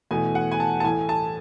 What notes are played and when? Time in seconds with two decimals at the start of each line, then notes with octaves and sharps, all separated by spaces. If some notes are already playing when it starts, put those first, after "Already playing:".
0.11 E2 B2 A3 G#5
0.35 F#5
0.51 G#5
0.60 A5
0.80 A5
0.84 A2 E3 A3 G#5
1.09 A5